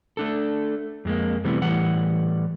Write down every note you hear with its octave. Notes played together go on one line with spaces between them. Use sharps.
A3 D4 A4
F2 G#3 A#3
C3 E3 G3 A3 B3
A2 E3 G3 F#5